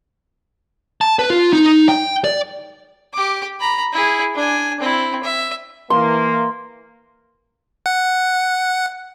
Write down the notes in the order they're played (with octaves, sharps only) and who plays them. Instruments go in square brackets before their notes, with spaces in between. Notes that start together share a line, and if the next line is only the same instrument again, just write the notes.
[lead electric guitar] A5
B4
F4
D#4
G5
D5
[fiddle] G4 D6
A#5 B5
E4 G#4
D4 G#5
C4 E4
E5
[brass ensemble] E3 A#3 [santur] C6
[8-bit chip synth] F#5